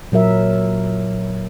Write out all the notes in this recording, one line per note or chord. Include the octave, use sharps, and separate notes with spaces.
A#2 F#3 A#4 E5